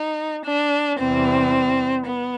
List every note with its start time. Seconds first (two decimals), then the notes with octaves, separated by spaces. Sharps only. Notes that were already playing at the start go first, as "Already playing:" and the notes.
Already playing: D#4
0.45 D4
0.99 E2 C3 E3 G3 C4
2.05 B3